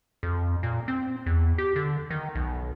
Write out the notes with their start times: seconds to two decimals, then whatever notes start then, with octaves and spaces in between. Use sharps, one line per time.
0.23 F2
0.63 A#2
0.88 C4
1.26 E2
1.58 G4
1.76 D3
2.10 D#3
2.35 B1